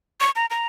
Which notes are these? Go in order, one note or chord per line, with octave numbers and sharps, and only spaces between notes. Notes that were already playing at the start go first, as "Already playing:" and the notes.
C#6
A#5
A#5